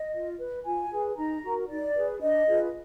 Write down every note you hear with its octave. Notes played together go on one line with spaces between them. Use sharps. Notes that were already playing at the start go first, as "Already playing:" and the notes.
Already playing: D#5
F4
B4
F4 G#5
G#4 B4
D#4 A#5
F#4 A#4
D#4 D5
G#4 B4
D4 D#5
F4 G#4 B4